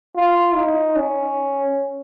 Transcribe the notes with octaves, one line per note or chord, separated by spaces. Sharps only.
F4
D#4
C#4